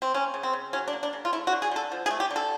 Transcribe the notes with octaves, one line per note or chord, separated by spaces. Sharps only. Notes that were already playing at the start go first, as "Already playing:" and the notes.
C4
A#3 C#4
C#3
C4
C#3
F#3 C#4
D4
A#3
D4
C#3
F4
A3 E4
F#4
D3
G#4
D3 A4
F3
G#4
A3
G4
D3
A4